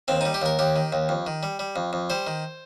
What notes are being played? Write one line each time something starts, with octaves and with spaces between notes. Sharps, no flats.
D#2 C4
G3 D#4
G4
D#2 A#4
D#2 G4
D#3
D#2
F2
D#3
G3
G3
F2
F2
G3 C5
D#3